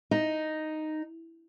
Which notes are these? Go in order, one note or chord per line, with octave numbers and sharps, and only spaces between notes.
D#4